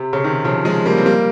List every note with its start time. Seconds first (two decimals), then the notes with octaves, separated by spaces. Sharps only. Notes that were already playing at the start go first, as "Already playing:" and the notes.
Already playing: C3
0.13 C#3
0.24 C3 D#3
0.44 C#3 F3
0.65 F3 G#3
0.85 G3 A#3
0.97 C4
1.06 G3 A#3